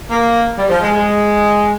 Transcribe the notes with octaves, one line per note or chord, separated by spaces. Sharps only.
A#3
G3
F3
G#3
G#3